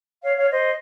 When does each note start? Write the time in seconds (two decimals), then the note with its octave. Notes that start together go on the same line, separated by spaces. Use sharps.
0.22 C#5 F5
0.36 C#5 F5
0.50 C5 D#5